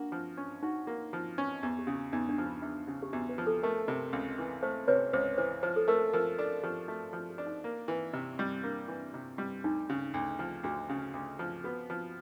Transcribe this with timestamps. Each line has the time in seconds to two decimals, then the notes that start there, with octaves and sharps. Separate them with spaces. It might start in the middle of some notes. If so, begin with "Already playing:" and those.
Already playing: A#3 D4 F#4
0.12 F3
0.37 C#4
0.63 D#4 F#4
0.87 A#3 F#4
1.13 F3
1.38 C#4
1.63 E2 G4
1.79 G4
1.87 C#3
1.95 F#4
2.13 E2 D#4
2.29 D4
2.38 F3
2.46 F4
2.62 E2
2.88 C#3
3.03 G4
3.13 E2 F#4
3.29 B4
3.38 F3
3.47 A4
3.63 A3 A#4
3.88 C3
4.13 C#2
4.39 E3
4.63 A3 C5
4.88 C3 B4 C#5
5.13 C#2 C5
5.38 E3 C5
5.63 F3 C5
5.76 A4
5.88 A3 A#4
6.13 F3 A#4
6.38 D4 A4
6.63 F3 G4
6.88 A3 F#4
7.13 F3 F#4
7.30 G4
7.38 D4
7.47 D#4
7.64 A#3
7.88 E3
8.13 C3
8.39 G3
8.63 A#3 D4
8.88 E3
9.14 C3
9.38 G3
9.64 D2 D#4
9.89 C#3
10.14 D2
10.39 F3
10.64 D2 F#4
10.89 C#3
11.14 D2
11.39 F3
11.64 B3 F#4
11.90 F3